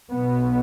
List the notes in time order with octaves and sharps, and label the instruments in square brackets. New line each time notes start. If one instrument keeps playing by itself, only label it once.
[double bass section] B1 B2 B3